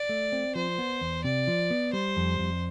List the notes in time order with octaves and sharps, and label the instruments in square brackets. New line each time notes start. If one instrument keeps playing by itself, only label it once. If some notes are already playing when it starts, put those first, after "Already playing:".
Already playing: [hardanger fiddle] D5
[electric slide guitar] A3
C4
[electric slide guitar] F3 [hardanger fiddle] C5
[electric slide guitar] B3
E2
[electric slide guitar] C3 [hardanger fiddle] D5
[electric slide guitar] F3
B3
[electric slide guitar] G3 [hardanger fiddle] C5
[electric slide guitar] F2
F2